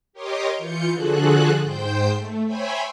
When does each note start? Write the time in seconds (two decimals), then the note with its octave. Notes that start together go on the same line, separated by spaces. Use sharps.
0.13 G4 A#4 C#5 D#5 C6 D6
0.58 E3 F4 G6 C#7
0.92 D3 F3 F#4 G#4 A4 F#6
1.62 G#2 C5 G5 G6
2.15 A3
2.46 C5 C#5 E5 G5 G#5 B5